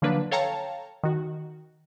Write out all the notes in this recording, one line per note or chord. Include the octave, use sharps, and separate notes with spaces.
D3 F3 F#3 A#3 D4 B4
A4 C#5 F5 G5 A5 A#5
D#3 F#4